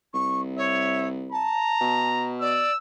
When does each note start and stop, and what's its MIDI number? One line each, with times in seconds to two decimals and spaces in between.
0.14 1.50 36
0.14 0.41 85
0.58 1.07 73
0.58 1.09 76
1.32 2.08 81
1.32 2.34 82
1.81 2.65 47
2.41 2.71 74
2.41 2.77 88